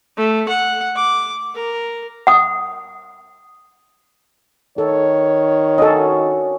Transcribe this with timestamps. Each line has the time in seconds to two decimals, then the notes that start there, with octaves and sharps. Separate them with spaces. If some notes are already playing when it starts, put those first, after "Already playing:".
0.17 A3
0.49 F#5
0.96 D6
1.55 A#4
2.27 F#5 D#6
4.78 D#3 A4 C#5
5.78 C#4 D4 F#4 A4 D#5